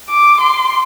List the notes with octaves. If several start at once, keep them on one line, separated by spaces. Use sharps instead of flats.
D6
C6